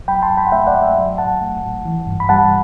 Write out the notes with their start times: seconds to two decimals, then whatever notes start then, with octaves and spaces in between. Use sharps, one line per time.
0.08 F#3 G5 B5
0.22 A5 C6
0.30 F#2
0.37 G5 B5
0.47 F#5
0.52 A3 E5 G5
0.67 D5 F#5
0.74 F#2
0.82 E5 G5
0.97 F#3
1.18 A2 F#5 A5
1.41 A3
1.63 A2
1.85 E3
2.07 G2
2.20 B5
2.29 G3 F#5 A5